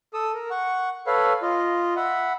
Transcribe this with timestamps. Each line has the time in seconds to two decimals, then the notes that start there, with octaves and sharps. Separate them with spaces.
0.14 A4 D#6 E6
0.34 A#4
0.51 F#5 C#6
1.07 A4 B4 C#5 F5 B5
1.42 F4 D#5
1.96 E5 F#5 B5